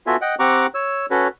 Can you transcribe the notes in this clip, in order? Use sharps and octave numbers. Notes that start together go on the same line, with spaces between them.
B3 F4 F#4 A4 E5 G#5
D#5 F#5 G5
C4 G4 F#5 A#5 C#6 D6
C#5 E6
C#4 F#4 A4 B4 C#5